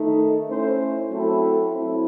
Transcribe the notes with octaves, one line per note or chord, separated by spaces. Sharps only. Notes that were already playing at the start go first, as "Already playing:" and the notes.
Already playing: D#3 A3 D#4
A3 C#4 E4 C5
F#3 A3 C4 E4 A4
F#3 C4 E4